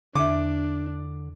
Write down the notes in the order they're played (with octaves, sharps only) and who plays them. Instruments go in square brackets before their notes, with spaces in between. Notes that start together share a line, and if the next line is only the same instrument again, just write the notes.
[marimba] E2 E5 [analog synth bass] D3 [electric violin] D4 [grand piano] D6